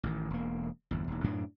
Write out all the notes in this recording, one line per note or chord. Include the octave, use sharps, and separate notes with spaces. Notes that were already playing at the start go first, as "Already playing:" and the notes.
A1 D#3
E1 A#3
G1 E2
E1 D#2
F#2 A2 F#3 D4